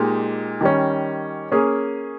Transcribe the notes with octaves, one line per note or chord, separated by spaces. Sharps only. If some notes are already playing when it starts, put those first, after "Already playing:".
Already playing: A#2 G#3 D#4 G4
D#3 G3 C#4
A#3 C#4 G#4